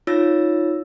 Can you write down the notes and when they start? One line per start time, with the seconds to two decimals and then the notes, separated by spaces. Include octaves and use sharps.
0.07 D#4 F4 C#5 E6 A6 A#6